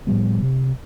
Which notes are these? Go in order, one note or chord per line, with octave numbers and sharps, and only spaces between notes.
A2 F3 G3 B3
C3